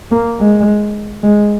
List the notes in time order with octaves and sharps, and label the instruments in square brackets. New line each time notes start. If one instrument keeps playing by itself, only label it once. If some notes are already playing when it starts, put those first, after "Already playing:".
[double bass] A#3
G#3
G#3